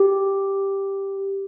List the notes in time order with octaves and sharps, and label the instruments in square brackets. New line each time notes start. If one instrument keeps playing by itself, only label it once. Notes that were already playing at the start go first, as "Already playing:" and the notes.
Already playing: [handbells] G4